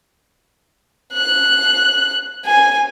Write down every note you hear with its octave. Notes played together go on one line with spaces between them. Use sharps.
F#6
G#5